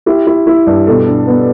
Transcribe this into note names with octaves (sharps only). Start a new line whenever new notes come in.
E4 G4
E4
E4
G2
B2 A4
D4
B3